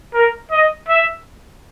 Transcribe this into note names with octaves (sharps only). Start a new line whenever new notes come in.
A#4
D#5
E5